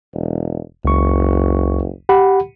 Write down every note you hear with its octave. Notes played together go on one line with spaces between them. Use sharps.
E1
F#1 C#2 C#6
G4 F#5 B5